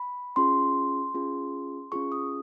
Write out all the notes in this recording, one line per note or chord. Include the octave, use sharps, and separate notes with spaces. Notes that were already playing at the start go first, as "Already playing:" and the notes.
Already playing: B5
C#4 F4 G#4 C6
C#4 F4 G#4
C#4 F4 G#4 C#6
D#6